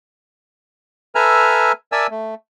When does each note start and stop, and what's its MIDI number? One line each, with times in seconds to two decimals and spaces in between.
1.15 1.72 69
1.15 1.72 71
1.15 1.72 76
1.15 1.72 80
1.15 1.72 82
1.15 1.72 89
1.92 2.07 70
1.92 2.07 74
1.92 2.07 76
1.92 2.07 80
1.92 2.07 81
1.92 2.07 88
2.11 2.35 57